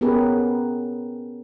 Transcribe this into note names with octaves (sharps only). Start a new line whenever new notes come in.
B3 C#4 G4 G#4 A#4 B4